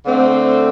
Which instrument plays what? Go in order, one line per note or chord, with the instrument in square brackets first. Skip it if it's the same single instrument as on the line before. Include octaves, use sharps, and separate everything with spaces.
[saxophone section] D3 A3 C4